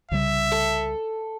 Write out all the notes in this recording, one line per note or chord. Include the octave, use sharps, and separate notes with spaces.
C2 C#3 G3 E5
A4